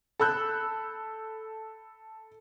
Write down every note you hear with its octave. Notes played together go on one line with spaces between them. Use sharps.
A4 B5 E6 F#6 G6